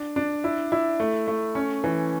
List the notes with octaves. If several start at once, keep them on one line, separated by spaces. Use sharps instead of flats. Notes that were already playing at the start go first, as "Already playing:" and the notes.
Already playing: D4
D4
E4
E4
A3
A3
C#4
E3